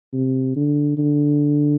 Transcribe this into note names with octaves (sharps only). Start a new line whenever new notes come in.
C3
D3
D3